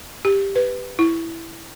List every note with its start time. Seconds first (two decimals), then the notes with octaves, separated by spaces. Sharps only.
0.25 G4
0.56 B4
0.99 E4